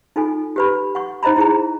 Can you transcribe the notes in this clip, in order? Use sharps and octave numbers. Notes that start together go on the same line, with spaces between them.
D#4 F4 A4 G#5
G4 B4 B5
F#5 C#6
D#4 C5 D#5 A#5 B5
E4 G#4 A#5